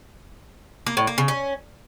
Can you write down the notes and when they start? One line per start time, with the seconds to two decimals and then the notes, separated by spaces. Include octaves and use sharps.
0.86 A#3
0.97 A2
1.07 A#3
1.18 C#3
1.28 C#4